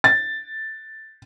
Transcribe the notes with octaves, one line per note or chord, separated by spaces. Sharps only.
A6